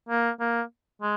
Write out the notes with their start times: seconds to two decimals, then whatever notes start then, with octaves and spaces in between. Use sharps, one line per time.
0.09 A#3
0.40 A#3
1.02 G#3